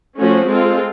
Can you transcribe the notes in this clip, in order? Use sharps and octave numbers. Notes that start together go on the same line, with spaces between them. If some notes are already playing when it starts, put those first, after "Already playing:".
F3 A3 C#4 F#4
G#3 C4 F4 A4